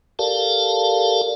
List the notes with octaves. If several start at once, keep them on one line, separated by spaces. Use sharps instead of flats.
G4 A4 A#4 D5 F5 A5